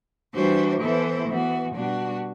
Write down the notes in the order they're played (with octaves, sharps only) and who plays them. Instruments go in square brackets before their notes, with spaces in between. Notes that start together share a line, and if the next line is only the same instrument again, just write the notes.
[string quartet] E3 G3 D4 F#4 C5
E3 B3 E4 A4 C5
E3 B3 F#4
B2 G3 D4 F#4